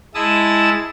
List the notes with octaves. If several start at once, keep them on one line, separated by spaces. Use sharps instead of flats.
G#3 E4 A5 D#6 E6